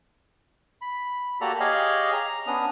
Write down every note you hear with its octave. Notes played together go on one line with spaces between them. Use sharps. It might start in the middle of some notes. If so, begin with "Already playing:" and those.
B5
A#3 F#4 G4 A4 D5 A#5
G4 G#4 C#5 D#5 F5
A#5
B3 C#4 D4 D#6